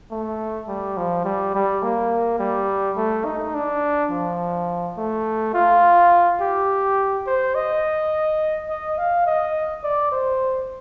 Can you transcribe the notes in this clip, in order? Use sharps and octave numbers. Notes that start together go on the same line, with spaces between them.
A3
G3
F3
G3
G3
A#3
G3
A3
D#4
D4
F3
A3
F4
G4
C5
D#5
D#5
F5
D#5
D5
C5